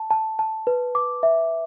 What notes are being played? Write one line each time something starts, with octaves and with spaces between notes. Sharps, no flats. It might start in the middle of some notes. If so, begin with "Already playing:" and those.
Already playing: A5
A5
A5
B4
D6
E5